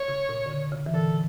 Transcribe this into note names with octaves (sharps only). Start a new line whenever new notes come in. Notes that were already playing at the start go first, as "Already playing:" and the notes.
Already playing: C#5
C#3
A#2
D3
C#3
C#3
E3
A#2 D3 A4